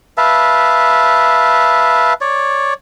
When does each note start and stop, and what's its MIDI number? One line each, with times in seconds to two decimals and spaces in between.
0.17 2.13 71
0.17 2.13 76
0.17 2.13 77
0.17 2.13 81
2.21 2.74 73
2.21 2.74 74